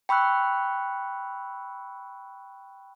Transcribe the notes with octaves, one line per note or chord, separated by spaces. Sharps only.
G5 B5 C#6 E6 F#6